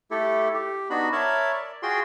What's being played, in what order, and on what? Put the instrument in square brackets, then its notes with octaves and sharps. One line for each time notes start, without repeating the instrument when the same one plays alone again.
[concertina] A3 E4 G4 A4
G4
B3 D4 D#4 F#4 B5
A#4 C#5 E5 A5 B5
D5
F4 F#4 G#4 G5 C6